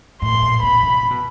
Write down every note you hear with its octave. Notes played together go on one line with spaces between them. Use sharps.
A2 C6
A#2
B2 B5
C3
C3
B2